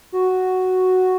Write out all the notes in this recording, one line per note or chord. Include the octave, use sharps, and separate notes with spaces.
F#4